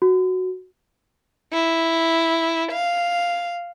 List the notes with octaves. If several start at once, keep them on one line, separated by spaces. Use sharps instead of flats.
F#4
E4
F5